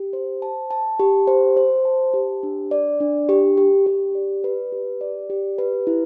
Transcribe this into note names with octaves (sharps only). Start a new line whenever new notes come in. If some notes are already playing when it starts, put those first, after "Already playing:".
Already playing: G4
C5
A5
A5
G4
C5
C5
A5
G4
D4
D5
D4
G4
G4
G4
D5
B4
G4
D5
G4
B4
E4